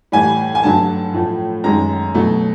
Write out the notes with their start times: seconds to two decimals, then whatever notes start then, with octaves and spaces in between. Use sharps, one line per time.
0.12 A2 E3 G3 G#5
0.55 G#5
0.63 G2 D3 F#3 A3 A5
1.13 A2 F3 A3
1.64 F#2 D#3 G#3 A#5
2.14 B2 F#3 A3